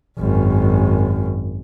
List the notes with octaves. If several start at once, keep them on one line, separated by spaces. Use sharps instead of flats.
G#1 F#2